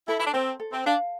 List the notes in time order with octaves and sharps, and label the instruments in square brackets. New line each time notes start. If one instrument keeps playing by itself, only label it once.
[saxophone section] E4 [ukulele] A4
[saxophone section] E4
D4
[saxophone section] C4 [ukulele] C5
[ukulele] A4
[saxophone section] C4
[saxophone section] D4 [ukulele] F5